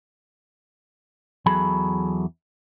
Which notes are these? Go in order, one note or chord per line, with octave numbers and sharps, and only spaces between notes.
E2 F#3 G#4 A4 B5